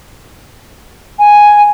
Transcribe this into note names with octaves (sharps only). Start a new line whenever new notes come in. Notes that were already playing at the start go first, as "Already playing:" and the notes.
G#5